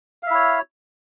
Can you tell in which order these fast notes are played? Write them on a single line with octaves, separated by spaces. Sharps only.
F5 E5 E4 C#5